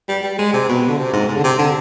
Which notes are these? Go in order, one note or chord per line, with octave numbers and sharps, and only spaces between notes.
G3
G3
G#3
C3
B2
D3
C3
G#2
G#2
D3
C3
D3